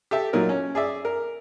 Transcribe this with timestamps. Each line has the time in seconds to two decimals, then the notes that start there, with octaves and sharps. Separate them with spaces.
0.11 G4 A4 E5
0.33 A#2 F#3 D#4 A#4
0.49 C#4
0.75 G#4 D5 E5
1.05 A#4